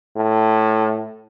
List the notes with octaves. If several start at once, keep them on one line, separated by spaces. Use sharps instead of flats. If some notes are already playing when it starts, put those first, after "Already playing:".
A2